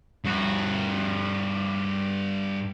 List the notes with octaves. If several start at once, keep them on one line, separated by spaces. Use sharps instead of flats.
G2 F#4